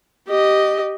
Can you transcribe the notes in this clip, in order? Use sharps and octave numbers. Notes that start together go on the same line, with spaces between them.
G4 D#5